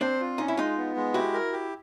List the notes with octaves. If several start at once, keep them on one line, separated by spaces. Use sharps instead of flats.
C4 D4 C5
F4
C#4 D#4
E4
G#3 D#4 F4
B3
G#3
E4 F#4 G4
A#4
G4